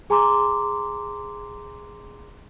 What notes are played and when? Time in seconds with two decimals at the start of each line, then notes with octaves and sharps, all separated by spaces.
0.10 G#4 G#5 A#5 C6 D6